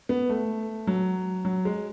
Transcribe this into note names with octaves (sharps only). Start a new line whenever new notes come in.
B3
A3
F#3
F#3
G#3